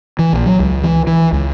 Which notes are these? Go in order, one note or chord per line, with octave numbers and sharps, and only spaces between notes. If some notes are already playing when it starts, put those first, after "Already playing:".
E3
A#1
F#3
C#2
E3
E3
C#2